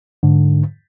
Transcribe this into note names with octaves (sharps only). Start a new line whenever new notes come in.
G#2 D3